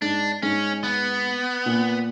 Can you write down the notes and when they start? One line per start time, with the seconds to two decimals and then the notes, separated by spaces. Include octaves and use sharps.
0.02 G#2 D4
0.43 G#2 C#4
0.84 B3
1.66 A#2